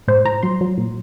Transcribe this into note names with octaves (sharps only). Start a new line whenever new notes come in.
A2 C5
A2 A#5
F#3 C6
F#3
A#2